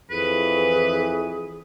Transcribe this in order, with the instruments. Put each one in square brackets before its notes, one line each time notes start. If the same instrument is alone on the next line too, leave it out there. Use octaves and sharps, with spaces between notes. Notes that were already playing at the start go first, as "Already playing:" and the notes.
[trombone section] F2 E3 [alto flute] G#4 [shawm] B4